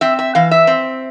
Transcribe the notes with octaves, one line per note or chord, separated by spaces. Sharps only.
C4 E5
E5
E3 F5
E5
C4